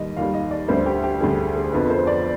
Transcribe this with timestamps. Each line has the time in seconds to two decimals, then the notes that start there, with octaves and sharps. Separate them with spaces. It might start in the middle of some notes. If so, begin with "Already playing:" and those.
Already playing: D#2 D#3 G3 D#5
0.17 D#2 D#3 G3 F5
0.34 D#5
0.51 D5
0.68 D2 D3 G3 C5
0.86 G4
1.03 G4
1.20 D2 D3 G3 G#4
1.56 G#4
1.72 F2 D3 F3 B3 B4
1.90 C5
2.07 D5